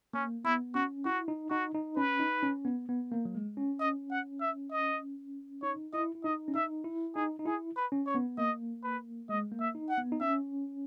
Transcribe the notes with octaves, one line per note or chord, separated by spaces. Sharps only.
A#3 C#4
B3 E4
C#4 F#4
E4 F#4
D#4
D#4 F#4
D#4
C#4 B4
D#4
C#4
B3
B3
A#3
F#3
G#3
C#4
D#5
F#5
E5
D#5
D#4 C#5
E4 D#5
E4
D#4 D#5
C#4
D#4 E5
E4
D#4 G#4
D#4
E4 G#4
B4
C#4
C#5
B3
A#3 D#5
B4
G#3 D#5
A#3
E5
D#4
F#5
B3
D#4
C#4 E5